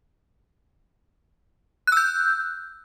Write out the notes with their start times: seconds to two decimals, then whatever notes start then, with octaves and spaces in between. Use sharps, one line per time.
1.87 F#6
1.92 E6
1.97 G6